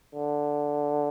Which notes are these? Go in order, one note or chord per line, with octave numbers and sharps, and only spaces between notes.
D3